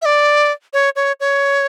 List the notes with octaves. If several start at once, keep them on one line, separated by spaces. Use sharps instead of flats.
E5
D5
C#5
C#5
C#5